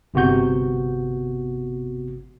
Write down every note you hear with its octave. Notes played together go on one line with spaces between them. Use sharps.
G1 C3 B3 F#4 G6